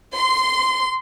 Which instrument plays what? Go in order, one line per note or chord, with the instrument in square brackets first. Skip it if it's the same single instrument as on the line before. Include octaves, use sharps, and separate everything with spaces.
[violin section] C6